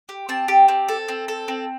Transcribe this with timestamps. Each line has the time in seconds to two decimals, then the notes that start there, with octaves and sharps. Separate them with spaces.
0.09 G4
0.29 C4 A5
0.48 G4
0.68 C4
0.89 A4
1.08 C4
1.28 A4
1.48 C4